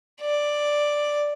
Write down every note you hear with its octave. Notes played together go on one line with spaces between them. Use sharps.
D5